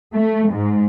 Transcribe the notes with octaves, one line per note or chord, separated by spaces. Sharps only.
A3
G#2